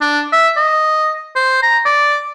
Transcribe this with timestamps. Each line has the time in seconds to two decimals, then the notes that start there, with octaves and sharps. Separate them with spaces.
0.01 D4
0.32 E5
0.57 D#5
1.36 C5
1.62 A#5
1.85 D5